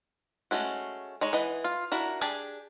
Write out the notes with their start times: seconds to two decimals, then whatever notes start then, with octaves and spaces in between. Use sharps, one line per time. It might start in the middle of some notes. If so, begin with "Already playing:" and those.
0.51 G#3 A3 C#4 F#4
1.21 G#3 D#4 C#5
1.33 E3 D#5 F#5
1.64 F4
1.92 D4 E4 F#4 A#4
2.21 D4 G4 G#4 G#5 A5